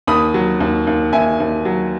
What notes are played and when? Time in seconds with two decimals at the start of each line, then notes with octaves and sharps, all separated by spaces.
0.07 D#2 B5 D#6
0.34 F#3
0.60 D#2
0.87 D#2
1.13 D#2 E5 G#5
1.40 D#2
1.65 F#3